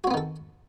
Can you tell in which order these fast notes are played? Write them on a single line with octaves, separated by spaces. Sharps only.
F#4 C4 B3 D#3 A4